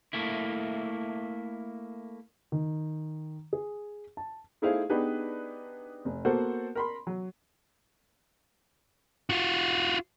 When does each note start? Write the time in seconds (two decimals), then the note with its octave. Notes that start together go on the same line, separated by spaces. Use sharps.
0.13 A3 A#3 E4
2.52 D#3
3.53 G#4
4.17 A5
4.62 A3 D#4 E4 G#4 C5 F5
4.90 B3 D4 D#4 G4 G#4 B4
6.05 F1
6.25 A#3 B3 F#4 A4 C5 F#5
6.75 A#4 B5 C6
7.07 F#3
9.30 F4 F#4